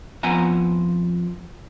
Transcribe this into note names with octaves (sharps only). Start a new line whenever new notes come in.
F2 F3 B3 F#5 G#5 A#5